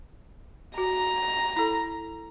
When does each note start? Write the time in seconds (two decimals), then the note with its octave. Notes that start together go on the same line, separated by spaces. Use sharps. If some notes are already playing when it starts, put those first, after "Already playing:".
0.78 F#4 A#5
1.56 E4 A4